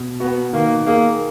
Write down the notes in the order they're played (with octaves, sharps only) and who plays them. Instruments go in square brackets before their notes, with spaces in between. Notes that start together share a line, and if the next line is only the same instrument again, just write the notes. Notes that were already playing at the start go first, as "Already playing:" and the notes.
Already playing: [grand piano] B2
[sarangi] B3 [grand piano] F#4
[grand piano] D#3 [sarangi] A#3
[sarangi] A#3 [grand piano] G#4